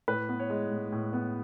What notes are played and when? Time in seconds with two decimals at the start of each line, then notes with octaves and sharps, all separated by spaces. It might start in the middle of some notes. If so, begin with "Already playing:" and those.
0.08 A2 B4
0.29 B3
0.39 C#5
0.50 G#3
0.71 A2
0.92 A2
1.13 B3